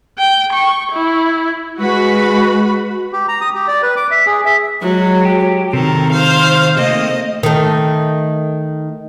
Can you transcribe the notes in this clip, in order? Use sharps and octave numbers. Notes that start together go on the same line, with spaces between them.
G5
C#6
E4
G#3 F#4 B4 B5
G4
A#5
D#6
G4
D5
B4
D6
E5
G#4
E5
F#3 G#3
G4
C3 D#3 A4 A#4
C5 F5
A3 A#3 C4 D#5
D#3 A3